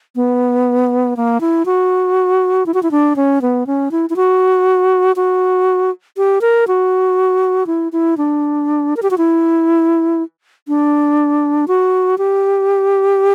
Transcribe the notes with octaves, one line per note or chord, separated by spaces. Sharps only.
B3
A#3
E4
F#4
E4
F#4
E4
D4
C#4
B3
C#4
E4
E4
F#4
F#4
G4
A#4
F#4
E4
E4
D4
A#4
G4
F#4
E4
D4
F#4
G4